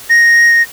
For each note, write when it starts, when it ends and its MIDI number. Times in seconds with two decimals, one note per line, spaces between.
0.10 0.62 94